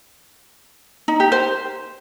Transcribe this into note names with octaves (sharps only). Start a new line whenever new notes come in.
D#4
G4
C5